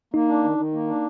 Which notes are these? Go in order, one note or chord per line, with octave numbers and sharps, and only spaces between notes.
A#3 D#4
D4
D#3
D#3
A#3
D4